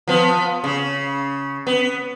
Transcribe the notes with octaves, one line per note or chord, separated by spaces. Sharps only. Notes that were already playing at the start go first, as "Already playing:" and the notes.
F3 B3
C#3
B3